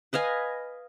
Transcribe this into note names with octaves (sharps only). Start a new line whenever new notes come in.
B4 D#5 F5 G#5